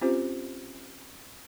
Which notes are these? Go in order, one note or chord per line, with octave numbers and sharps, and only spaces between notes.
C4 C#4 F4 G4 C5